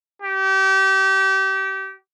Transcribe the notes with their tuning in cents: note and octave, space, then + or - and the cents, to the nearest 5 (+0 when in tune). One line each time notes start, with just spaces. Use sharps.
G4 -30